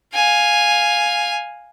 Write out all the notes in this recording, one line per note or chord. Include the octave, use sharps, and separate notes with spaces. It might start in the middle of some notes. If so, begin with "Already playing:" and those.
F5 G#5